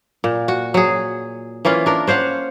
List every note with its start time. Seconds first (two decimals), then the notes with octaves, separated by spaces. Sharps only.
0.24 A#2
0.48 F#4
0.74 F#3 G#4
1.65 E3 A#3 C#4 F4
1.86 D4 A#4
2.07 C#4 C5 F5 F#5